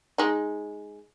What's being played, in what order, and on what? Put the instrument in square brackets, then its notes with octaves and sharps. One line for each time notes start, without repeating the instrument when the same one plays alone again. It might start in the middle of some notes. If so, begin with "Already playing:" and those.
[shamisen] G#3 D#4